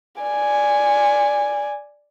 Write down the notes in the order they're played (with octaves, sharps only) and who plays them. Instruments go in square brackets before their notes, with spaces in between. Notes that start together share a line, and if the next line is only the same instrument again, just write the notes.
[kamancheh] D5 G#5